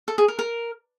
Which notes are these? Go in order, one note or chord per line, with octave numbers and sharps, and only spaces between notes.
A4
G#4
A#4
A#4